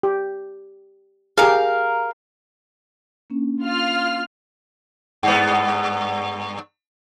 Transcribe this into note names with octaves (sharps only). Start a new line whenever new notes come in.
G4
G4 G#4 A#4 F5
A#3 C#4 D4
F4 F6
G2 B3